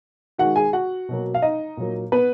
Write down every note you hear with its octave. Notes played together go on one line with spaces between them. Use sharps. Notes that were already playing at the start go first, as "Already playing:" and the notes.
D#3 G#3 F#4 F#5
G#4 G#5
F#4 F#5
B2 F#3 A#3
F5
D#4 D#5
A#2 F#3 A#3
B3 B4